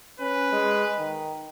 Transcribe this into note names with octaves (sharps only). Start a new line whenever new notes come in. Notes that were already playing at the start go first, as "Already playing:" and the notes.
C#4 B4
G#3
D#3